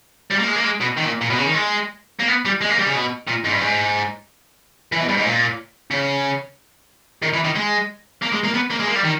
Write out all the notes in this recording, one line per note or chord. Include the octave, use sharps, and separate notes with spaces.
G3
A#3
G#3
A#3
G#3
B2
D#3
A#2
A#2
B2
C#3
D#3
G#3
A#3
B3
G3
G#3
A#3
G3
C#3
B2
A#2
G#2
G2
G#2
E3
B2
G2
G#2
A#2
C#3
D#3
E3
D#3
G#3
A#3
G#3
A#3
B3
A#3
G#3
A#3
G3
D#3